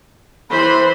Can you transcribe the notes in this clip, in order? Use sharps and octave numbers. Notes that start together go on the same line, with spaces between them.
E3 C5 B5